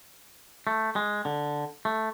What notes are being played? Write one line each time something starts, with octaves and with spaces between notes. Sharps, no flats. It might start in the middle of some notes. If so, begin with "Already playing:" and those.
A3
G#3
D3
A3